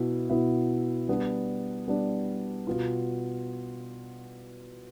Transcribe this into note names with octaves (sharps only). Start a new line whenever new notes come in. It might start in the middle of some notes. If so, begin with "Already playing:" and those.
Already playing: B2 B3 E4
B2 B3 E4
G3 B3 D4
G3 B3 D4
B2 B3 F4